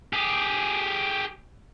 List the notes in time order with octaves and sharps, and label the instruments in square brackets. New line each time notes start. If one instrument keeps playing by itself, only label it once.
[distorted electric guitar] G4 G#4